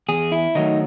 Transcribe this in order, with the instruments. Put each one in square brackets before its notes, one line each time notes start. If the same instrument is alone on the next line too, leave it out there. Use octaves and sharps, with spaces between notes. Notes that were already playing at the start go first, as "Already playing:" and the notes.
[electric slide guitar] E2 G#4
E4
D#3 F#3 A3 D#4